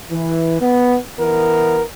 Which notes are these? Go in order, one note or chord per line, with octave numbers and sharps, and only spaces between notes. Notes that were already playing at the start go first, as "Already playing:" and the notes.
E3
B3
E3 B3 A#4